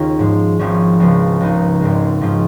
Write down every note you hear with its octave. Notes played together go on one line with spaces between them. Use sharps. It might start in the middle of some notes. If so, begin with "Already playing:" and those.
Already playing: D#2 D#3 C#4 F4 G#4
G#2 F3 G#3
G#1 G#2 F3 C#4
C#2 C#3 F3 G#3 C#4
C#2 C#3 A#3 D#4
G#1 G#2 G#3
G#2 F3 C#4 F4